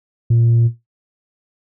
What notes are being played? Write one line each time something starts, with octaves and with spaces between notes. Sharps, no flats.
A#2